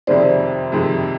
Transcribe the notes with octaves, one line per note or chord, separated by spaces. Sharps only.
F2 C3 D#3 G#3 C5 D5
F2 C3 D#3 G#3